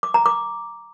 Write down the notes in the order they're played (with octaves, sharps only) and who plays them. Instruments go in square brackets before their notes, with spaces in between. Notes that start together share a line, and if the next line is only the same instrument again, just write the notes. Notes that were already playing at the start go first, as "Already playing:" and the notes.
[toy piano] D6
A#5
D6